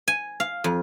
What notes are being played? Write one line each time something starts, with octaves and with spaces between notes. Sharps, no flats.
G#5
F5
F2